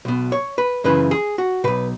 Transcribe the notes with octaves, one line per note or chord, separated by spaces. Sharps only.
B1 B2
C#5
B4
F#2 C#3 E3 B4
G#4
F#4
B1 B2 B4